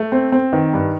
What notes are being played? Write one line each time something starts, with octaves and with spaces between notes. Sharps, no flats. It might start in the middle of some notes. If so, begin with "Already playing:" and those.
Already playing: A3
C4
C4
D#3
G2